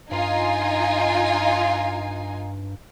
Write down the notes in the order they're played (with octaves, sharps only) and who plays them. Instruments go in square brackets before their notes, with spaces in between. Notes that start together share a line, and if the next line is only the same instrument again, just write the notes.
[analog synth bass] G2 [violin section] D#4 F4 G#5